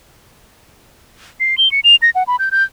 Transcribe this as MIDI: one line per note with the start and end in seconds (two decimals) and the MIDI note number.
1.40 1.58 96
1.58 1.71 103
1.72 1.80 97
1.84 1.96 101
2.02 2.10 94
2.15 2.23 78
2.27 2.36 83
2.39 2.49 91
2.51 2.63 91